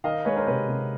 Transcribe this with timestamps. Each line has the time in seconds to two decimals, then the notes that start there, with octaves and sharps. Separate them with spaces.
0.04 D#3 D#5 F5
0.25 G#3 B4 C#5
0.36 A#4 C5
0.47 C3 B4 C#5
0.69 C3